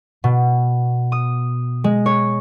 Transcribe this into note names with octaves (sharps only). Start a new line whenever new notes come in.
B2
D#6
G#3
C#5